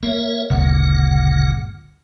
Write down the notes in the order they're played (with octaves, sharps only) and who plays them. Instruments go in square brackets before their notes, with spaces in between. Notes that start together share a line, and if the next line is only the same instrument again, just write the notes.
[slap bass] A#3 [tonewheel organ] A#4 C#5 E5
[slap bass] G1 D2 [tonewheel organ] A#2 C#3 F#5